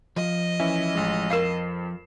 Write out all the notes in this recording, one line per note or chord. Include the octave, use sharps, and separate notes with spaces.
F3 D#5
E3 C#4 E5
A1 G#3
F2 A#4 F5 C7 E7